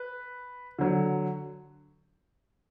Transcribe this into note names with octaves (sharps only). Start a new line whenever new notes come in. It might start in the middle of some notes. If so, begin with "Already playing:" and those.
Already playing: B4
D3 F#3